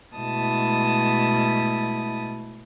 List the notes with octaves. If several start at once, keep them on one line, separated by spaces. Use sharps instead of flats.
B2 G#3 A3 E4 A5 D#6